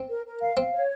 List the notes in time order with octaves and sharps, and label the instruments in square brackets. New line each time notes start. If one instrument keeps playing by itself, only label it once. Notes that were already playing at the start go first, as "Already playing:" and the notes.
Already playing: [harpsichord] C4
[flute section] A#4
A#4
F5
[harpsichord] C4 [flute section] F5
[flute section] C#5